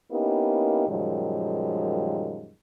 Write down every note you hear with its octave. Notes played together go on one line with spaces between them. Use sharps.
A#3 B3 C#4 D#4 E4 G4
F#2 A#2 D#3 F3 G3 G#3